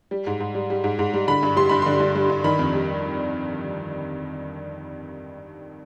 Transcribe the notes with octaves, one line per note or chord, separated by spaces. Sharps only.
G3
G#2
G#2
G3
G3
G#2
G#2
G3
D3 B5
G2
G3 C6
G2 B5
D3 C6
G2
G3
G2
D#3 B5
F2
G3